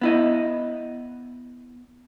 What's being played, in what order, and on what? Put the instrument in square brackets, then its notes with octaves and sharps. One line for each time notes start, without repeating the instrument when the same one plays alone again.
[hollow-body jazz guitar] B3 E4 D#5